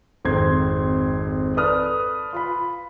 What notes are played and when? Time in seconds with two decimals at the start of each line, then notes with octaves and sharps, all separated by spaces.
0.25 G#1 F2 C4 C6 G#6
1.57 A4 B4 D5 D#6 F6
2.33 F4 B5